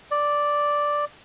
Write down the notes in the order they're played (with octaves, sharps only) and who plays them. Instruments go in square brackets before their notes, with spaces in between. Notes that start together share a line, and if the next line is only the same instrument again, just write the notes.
[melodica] D5